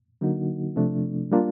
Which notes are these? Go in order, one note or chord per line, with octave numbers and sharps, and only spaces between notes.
D3 F#3 A#3 D#4 F#4
C3 F3 A3 D4
G3 A#3 D4 F4